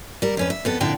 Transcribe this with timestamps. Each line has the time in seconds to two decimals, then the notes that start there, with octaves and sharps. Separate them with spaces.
0.22 G3 A#4
0.37 F2 C#4 B4
0.50 E5
0.65 F2 B3 A4
0.80 F2 A#2 D3 E4 G5 A5